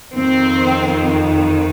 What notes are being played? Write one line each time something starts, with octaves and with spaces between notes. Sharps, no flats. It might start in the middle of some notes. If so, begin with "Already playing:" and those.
F2 D#3 C4